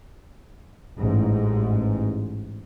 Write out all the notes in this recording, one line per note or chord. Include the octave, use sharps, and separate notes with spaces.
A1 G#2